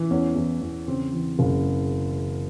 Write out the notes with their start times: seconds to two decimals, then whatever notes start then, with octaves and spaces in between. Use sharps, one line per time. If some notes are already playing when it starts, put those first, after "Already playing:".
Already playing: E3
0.11 E2 C#4
0.35 E2
0.61 E2
0.88 C#3 C4
1.13 E3
1.39 F#1